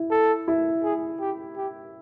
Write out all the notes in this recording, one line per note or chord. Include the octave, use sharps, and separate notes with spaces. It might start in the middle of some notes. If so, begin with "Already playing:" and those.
Already playing: E4
A4
E4
G#4
G4
G4